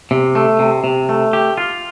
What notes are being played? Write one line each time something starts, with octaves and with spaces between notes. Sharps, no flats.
C3
A3
C3
C3
A3
G4
F4